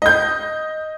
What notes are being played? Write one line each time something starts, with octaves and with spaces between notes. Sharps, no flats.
D#5 G6